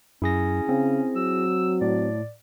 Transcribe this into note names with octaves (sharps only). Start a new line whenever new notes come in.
F#2 C#4 E4 G#4 A#6
C#3 C4
F#3 E6
A2 D5